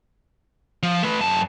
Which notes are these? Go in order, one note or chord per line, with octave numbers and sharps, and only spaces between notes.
F3
A3 B4
F#2 A5